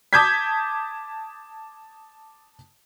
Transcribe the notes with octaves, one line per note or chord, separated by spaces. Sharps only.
A5 D6 D#6 G6 G#6 B6